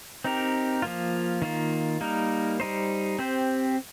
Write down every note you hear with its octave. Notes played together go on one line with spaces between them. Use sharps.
C4 D#4 G4 A#4
F3 A#3 F4
D#3 A#3 F4
G3 A#3 D#4 A#4
G3 D#4 C5
C4 G4 C5